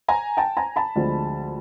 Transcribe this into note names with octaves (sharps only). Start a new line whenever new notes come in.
G#5 A#5
G5 A5
G#5 A#5
A5 B5
D2 D3 F3 G#3 C4